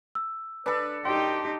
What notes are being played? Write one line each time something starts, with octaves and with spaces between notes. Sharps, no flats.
E6
D4 A4 B4
F#2 D#4 G4 G5 C6